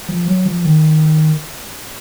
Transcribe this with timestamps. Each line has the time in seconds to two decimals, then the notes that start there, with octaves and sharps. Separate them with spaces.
0.09 F3
0.28 F#3
0.46 F3
0.65 D#3